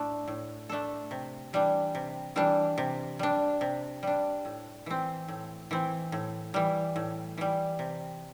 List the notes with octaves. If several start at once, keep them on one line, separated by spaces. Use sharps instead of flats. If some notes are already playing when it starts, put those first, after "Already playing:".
Already playing: A2 A3 D4 A4
A2
A3 D4 A4
C3
E3 G3 D4
C3
E3 G3 D4
C3
G3 D4
C3
G3 D4
A2
E3 C4
A2
E3 C4
A2
E3 G3
A2
E3 G3
C3